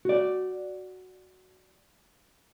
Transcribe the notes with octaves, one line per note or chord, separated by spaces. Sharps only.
F#4 D5